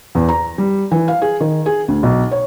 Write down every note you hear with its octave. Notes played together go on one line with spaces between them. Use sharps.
E2
A#5
G3
E3
F5
G#4
D#3
G#4
D2
B1
C#5